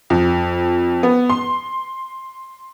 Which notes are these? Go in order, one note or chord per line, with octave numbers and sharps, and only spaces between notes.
F2
B3
C6